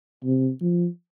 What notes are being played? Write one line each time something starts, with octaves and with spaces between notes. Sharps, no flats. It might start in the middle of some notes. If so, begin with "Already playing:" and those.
C3
F3